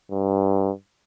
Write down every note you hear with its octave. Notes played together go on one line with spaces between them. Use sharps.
G2